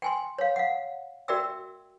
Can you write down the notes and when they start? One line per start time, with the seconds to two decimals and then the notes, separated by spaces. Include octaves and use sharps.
0.02 G5 G#5 C6
0.38 C#5 F5
0.56 F5 F#5
1.28 F#4 A#4 D5 E5 G5 E6